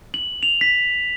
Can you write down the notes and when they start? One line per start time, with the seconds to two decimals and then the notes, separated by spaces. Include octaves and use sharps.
0.14 F#7
0.43 F7
0.61 B6